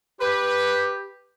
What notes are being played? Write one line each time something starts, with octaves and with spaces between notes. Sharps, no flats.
G4 B4